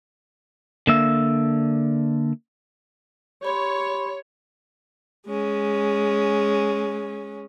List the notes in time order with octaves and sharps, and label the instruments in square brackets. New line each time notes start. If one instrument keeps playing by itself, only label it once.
[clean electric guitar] D3 A#3 E5
[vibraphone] G4 B5 C6 [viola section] C#5
[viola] G#3 C#4